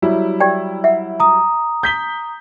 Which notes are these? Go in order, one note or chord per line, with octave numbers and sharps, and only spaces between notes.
F#3 G3 E4
G4 D5 G5
E5 F#5
A#5 D#6
G6 B6 G7